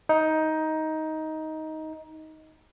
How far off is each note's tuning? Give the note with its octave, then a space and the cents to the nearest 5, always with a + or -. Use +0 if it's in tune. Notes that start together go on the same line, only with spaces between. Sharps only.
D#4 +15